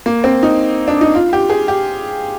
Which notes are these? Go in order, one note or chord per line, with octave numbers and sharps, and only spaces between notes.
A#3
C4
D#4
D4
D#4
F4
G4
G#4
G4